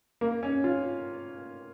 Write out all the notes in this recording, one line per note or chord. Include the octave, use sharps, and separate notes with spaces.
A#3
C#4
F4